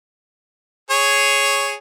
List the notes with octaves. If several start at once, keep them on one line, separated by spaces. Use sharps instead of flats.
G#4 C#5